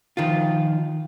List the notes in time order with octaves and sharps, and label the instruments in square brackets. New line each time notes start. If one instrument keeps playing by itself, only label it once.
[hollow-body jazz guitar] D#3 F3 F4